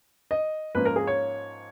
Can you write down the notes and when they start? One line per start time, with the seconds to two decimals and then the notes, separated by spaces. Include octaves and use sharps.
0.31 D#5
0.75 G#2 F3 A#3 C#4 B4
0.85 A#4
0.96 G#4
1.07 C#5